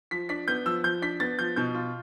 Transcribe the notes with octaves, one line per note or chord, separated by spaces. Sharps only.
F3 B6
D4 B6
B3 G6
F3 E6
F3 G6
D4 B6
B3 A6
F3 G6
B2 G6
F4